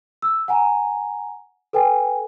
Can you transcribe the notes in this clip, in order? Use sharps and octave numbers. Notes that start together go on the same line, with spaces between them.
E6
F#5 G#5 A#5
A4 B4 G5 G#5